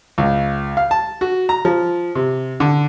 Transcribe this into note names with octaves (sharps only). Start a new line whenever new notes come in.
C#2
F5
A5
F#4
A#5
F3
C3
D3